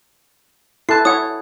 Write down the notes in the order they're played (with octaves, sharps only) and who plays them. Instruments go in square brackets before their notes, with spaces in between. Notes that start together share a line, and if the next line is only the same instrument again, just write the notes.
[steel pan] E4 A4 A5 [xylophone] F#6 C7
[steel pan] E4 C#5 [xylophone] F#5 D#6